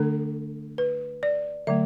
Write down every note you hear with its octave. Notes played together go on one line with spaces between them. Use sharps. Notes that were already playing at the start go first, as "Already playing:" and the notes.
Already playing: D3 A3 D4 A4
B4
D5
D3 F#3 A3 E5